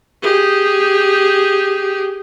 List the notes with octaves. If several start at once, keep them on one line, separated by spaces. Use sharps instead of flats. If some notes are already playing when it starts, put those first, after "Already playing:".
G4 G#4